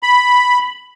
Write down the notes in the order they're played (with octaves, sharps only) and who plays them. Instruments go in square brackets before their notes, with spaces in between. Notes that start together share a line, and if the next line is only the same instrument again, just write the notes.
[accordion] B5